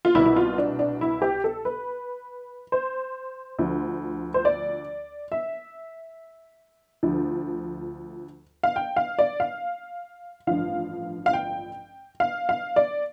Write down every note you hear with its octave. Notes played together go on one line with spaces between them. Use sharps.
F4
C2 B2 E4
E4
F4
D4
D4
E4
G4
A4
B4
C5
D2 D3 F3
C5
D5
E5
D2 D3 F3
F5
G5
F5
D5
F5
A1 G2 D3 F3 F5
F5
G5
F5
F5
D5